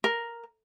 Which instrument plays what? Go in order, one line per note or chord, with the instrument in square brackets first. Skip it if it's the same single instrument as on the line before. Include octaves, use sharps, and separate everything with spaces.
[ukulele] A#4